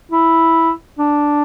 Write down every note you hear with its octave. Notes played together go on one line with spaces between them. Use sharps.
E4
D4